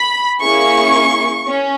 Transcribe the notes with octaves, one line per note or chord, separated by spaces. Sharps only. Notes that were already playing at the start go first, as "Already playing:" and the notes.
Already playing: B5
A#3 C#4 E4 G#4 C#6
C#4